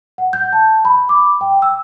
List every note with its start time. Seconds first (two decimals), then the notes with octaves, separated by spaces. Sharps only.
0.18 F#5
0.33 G6
0.53 A5
0.85 B5
1.09 D6
1.41 G5
1.62 E6